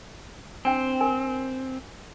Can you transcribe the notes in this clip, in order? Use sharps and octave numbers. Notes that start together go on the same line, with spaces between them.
C4 D4 G5
A#4 G#5